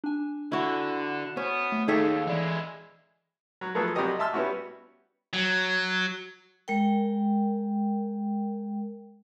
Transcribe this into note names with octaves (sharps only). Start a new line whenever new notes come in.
D4 G#5
D3 E4 F#4
B3 C#4 C5
A3
D#2 D#4 G#4 A4 E5 G5 C#6
E3 G#3 E4 D5
F#3
F3 F#3 A3 B3 G#4 A4
C2 F#3 G3 G4 D#5 D#6
E5 G#5 A5 C6 E6 F6
G3 B3 C#4 E4 F#4
F#3
G#3 A#4 G5